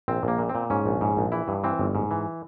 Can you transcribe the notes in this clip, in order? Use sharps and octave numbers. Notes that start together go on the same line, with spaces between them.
A#1 C4
A#1 A#3
A#2
C4
A#2
G#2 C#4
A#1
G#2
A#1
E3 E4
G2
E3 C4
G1
G#2
E3